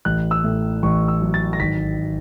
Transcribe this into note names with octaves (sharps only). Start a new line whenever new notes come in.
A1 F#6
E6
A2
A1 C#6
E6
F#3
A6
A#6
G#1 B6